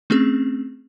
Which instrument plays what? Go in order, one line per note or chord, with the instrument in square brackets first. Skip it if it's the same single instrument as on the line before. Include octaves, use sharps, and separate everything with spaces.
[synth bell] A3 C4 C#4 G#4